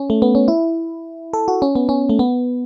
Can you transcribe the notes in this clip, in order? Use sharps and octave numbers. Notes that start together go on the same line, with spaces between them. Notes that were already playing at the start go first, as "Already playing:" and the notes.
Already playing: C#4
A3
B3
C#4
E4
A4
F#4
C#4
B3
C#4
A3
B3